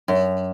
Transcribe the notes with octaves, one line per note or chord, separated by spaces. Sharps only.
F#2